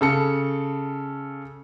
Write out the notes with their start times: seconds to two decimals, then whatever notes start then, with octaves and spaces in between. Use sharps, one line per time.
0.01 C#3 A4 C#7